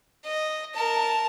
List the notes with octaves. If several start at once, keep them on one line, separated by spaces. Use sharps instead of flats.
D#5
A#4 A5